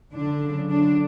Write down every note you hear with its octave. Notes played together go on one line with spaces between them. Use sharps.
D3 D4
C#3 F#3
D3 D4